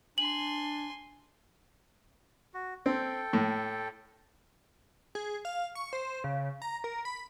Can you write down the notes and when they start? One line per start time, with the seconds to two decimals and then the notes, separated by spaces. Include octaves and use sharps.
0.18 D4 G#5 C6 F#7
2.54 F#4
2.86 C4 A4 G5
3.33 A2
5.15 G#4
5.45 F5
5.75 C#6
5.93 C5
6.24 C#3
6.62 A#5
6.84 A#4
7.05 B5